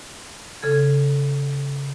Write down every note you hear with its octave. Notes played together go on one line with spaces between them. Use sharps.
C#3 A4 G#6